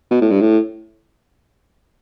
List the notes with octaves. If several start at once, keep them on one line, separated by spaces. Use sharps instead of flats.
B2
A2
G2
A2